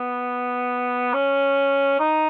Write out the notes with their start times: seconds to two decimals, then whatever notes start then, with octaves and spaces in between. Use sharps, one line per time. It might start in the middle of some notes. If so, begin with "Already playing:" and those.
Already playing: B3
1.14 C#4
2.00 D#4